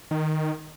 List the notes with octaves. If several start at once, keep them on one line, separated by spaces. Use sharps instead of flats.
D#3